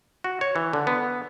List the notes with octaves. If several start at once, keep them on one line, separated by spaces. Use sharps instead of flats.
F#4
C#5
E3
D3
B3